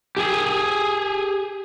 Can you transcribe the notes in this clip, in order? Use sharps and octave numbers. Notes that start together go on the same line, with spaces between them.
G4 G#4